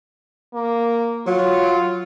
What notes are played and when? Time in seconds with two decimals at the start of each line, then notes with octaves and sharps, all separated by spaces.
0.54 A#3
1.27 F#3 F4